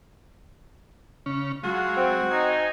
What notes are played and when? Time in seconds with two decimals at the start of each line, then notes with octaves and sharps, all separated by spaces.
1.26 C#3 C#4
1.63 F#3 G#3 F4 F#4
1.97 C4
2.31 D#4 G#5